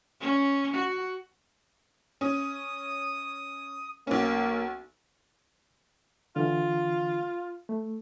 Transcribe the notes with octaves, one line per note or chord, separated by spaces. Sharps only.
C#4
F#4
C#4 D#6
B1 A#3 C#4
D3 E3 F4
A3